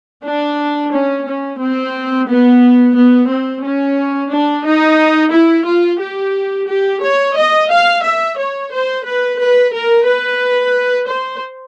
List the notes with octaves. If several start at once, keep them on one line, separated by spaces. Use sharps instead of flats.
D4
C#4
C#4
C4
B3
B3
C4
C#4
D4
D#4
E4
F4
G4
G4
C#5
D#5
F5
E5
C#5
C5
B4
B4
A#4
B4
C5